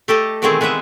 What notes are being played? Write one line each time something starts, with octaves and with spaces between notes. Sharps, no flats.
A3 G4 A4 D#5
B2 D#3 E3 A3 C4 G#4
G#3 B3 C4 B4 E5